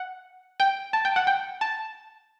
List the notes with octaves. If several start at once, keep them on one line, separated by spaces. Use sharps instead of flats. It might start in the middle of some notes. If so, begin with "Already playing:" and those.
Already playing: F#5
G5
A5
G5
F#5
G5
A5